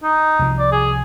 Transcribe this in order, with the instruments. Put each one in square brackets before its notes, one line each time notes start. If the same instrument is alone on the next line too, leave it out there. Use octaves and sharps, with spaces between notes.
[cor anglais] D#4
[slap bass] C2 F3
[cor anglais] D5
G#4